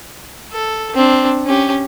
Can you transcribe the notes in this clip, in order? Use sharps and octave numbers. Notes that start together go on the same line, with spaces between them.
A4
C4 D4
C#4 G4